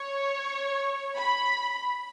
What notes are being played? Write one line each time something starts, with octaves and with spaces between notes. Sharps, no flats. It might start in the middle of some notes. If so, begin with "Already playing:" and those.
Already playing: C#5
B5